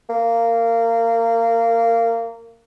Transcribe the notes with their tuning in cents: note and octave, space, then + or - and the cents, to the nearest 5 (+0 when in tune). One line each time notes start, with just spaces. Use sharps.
A#3 -20